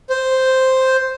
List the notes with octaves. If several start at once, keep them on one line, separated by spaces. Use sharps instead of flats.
C5